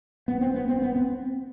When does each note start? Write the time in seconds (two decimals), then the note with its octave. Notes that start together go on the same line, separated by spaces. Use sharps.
0.28 B3
0.41 C4
0.55 B3
0.69 C4
0.82 B3
0.96 C4